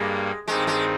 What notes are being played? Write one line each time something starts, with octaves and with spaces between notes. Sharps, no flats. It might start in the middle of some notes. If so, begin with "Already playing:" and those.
Already playing: G2 G3 G#3 A#3
G2 D#3 G3 G#3 C4 D#4
G#3